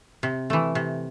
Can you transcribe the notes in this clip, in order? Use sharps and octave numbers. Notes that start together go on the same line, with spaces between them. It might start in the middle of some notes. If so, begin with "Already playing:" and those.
C3
E3 A3
C3